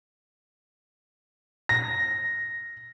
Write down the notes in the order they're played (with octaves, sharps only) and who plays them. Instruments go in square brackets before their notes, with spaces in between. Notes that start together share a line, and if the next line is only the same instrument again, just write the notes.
[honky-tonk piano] A#6